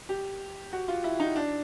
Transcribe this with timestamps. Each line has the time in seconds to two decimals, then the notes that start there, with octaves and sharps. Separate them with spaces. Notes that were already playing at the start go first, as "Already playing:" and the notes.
0.09 G4
0.73 F#4
0.88 F4
1.04 E4
1.20 D#4
1.36 D4